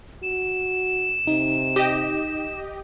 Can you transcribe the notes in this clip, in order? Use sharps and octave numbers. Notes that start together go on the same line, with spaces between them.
F#4 E7
C3 D#4
G4 D#5